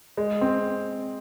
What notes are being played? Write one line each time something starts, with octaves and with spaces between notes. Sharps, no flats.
G#3
C4